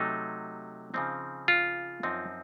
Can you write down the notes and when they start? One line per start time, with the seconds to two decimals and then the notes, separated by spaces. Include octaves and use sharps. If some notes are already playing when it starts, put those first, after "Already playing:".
Already playing: C3 F#3 A3 D#4
0.94 C#3 F3 C4 D#4
1.48 F4
2.03 F#2 F3 C4 D#4